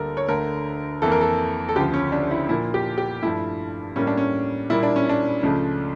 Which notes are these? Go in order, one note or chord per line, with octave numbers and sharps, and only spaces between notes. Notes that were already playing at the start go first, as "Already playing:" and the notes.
Already playing: D2 D3 G3 A#3 A4 A#4
C#5
D2 D3 A3 A#4
F2 E3 A#3 A4
A#4
A4
A4
D2 C#3 F3 G4
C#4
D4
E4
A#2 F3 A#3 E4
G4
G4
G2 F3 A3 E4
A2 G3 A#3 C#4
D4
C#4
A#2 G3 A#3 E4
D4
C#4
D4
C#2 C#3 F3 A3